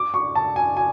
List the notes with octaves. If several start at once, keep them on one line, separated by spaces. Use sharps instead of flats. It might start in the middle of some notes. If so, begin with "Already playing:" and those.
Already playing: D6
C#6
A5
G#5
G#5